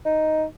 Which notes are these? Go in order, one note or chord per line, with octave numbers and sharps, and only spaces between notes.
D#4